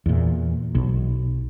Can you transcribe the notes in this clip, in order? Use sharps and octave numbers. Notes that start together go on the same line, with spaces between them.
E2 A#2
B1